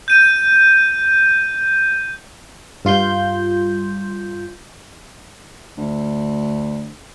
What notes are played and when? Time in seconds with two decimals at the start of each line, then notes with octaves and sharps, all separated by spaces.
0.08 G6 D#7
2.85 G2 F4 C6 G6
5.78 D2